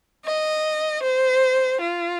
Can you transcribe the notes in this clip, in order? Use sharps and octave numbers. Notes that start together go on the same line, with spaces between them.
D#5
C5
F4